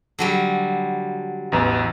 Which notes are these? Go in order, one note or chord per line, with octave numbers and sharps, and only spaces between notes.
D3 F#3 G3
A1 E2